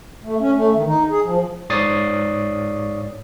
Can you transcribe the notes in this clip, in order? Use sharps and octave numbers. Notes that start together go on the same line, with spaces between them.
A3
C#4
A3
D#3
D#4
G#4
F3
G#2 C#5 D5 D#6 A6 C7